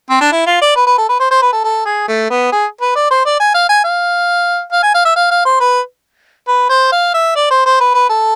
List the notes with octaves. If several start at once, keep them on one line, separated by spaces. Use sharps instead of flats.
C4
D4
E4
F4
D5
B4
B4
A4
B4
C5
C5
B4
A4
A4
G#4
A3
B3
G#4
B4
D5
C5
D5
G#5
F5
G#5
F5
F5
G#5
F5
E5
F5
F5
C5
B4
B4
C5
F5
E5
D5
C5
C5
B4
B4
A4